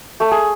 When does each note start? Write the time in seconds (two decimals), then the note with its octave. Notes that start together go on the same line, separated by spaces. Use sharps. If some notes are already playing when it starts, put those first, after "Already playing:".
0.20 A3 A4
0.31 G#4